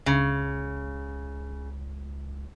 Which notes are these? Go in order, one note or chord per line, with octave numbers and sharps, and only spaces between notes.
C#2 C#3